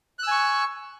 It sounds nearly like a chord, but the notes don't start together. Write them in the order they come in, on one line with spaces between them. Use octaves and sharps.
F#6 E6 G#5 C#6